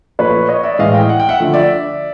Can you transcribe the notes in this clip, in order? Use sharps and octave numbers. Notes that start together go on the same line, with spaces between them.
A#2 F3 A3 B4 C#5
C#5 D#5
D5 E5
A2 E3 G#3 D#5 F5
F5 G5
F#5
G5
E5 F#5
D3 F3 A3
D5 E5